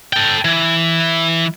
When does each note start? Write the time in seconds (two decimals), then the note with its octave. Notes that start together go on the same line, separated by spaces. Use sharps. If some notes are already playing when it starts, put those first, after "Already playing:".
0.13 A4 G5
0.45 E3